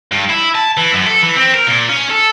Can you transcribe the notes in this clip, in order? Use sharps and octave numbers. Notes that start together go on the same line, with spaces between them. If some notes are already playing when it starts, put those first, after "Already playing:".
G2
E4
A5
E3
F#2
A4
E3
C4
A#4
A#2
C#4
A4